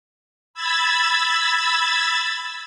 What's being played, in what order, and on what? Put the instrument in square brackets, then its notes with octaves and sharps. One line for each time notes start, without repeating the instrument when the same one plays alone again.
[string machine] B5 E6 G#6 A6